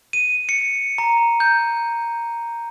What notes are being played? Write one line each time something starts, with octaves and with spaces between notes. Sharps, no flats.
D#7
C#7
A#5
G6